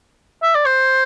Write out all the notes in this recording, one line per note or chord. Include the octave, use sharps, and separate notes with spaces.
E5
D5
C5